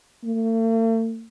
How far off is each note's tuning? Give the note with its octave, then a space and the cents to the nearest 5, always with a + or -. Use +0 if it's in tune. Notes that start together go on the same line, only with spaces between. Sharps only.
A3 +45